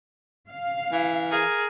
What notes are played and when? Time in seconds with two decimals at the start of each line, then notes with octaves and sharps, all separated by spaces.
0.49 F5
0.92 E3
1.31 G#4 A#4